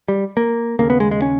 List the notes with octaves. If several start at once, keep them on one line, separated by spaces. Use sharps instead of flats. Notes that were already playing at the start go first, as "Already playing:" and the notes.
G3
A#3
D#2 C#3 A#3
B3
G#3
G#3
C#4